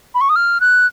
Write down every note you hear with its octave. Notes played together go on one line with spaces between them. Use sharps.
B5
C#6
D#6
F6
F#6